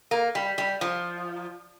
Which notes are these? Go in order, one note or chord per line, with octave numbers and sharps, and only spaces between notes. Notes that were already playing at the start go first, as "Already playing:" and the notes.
A#3
G3
G3
F3